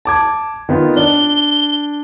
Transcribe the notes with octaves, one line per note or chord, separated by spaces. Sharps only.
A5 D6 G#6
D#3 B3 F4
D4 G7